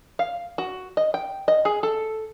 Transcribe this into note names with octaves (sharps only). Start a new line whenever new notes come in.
F5
F#4
D#5
G5
D#5
G#4
A4